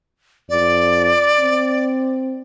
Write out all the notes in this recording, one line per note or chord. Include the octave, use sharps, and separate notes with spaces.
F2 D5
C4